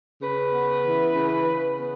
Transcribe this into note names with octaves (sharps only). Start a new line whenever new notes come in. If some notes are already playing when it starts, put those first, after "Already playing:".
C#3 B4
B3
E3
C#3
C#3
B3